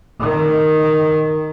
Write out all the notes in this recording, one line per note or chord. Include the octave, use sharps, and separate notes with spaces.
D#3